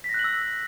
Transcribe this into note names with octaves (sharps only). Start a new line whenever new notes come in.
B6
A#6
F#6
F#7
E6